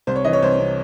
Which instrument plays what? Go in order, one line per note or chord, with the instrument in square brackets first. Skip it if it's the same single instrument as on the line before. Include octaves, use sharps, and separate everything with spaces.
[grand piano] C2 C5
C#5
E3 D#5
C#5
C2 C5
C3